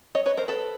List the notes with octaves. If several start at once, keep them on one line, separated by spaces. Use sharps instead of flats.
C#5 D#5
B4 C#5
A#4 C5
A4 B4